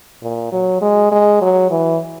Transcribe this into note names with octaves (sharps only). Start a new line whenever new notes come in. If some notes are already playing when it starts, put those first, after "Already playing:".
A#2
F#3
G#3
G#3
F#3
E3